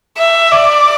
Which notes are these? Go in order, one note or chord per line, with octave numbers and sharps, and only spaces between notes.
E5
D5